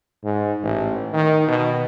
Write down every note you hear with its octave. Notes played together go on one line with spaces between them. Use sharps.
G#2
A1
D#3
B2